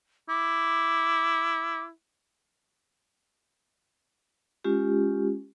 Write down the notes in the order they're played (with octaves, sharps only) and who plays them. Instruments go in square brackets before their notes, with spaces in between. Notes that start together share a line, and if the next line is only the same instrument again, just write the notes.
[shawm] E4 [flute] D6
[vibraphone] G#3 C#4 F4 G4